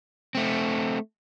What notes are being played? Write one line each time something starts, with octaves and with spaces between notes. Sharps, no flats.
A3 C4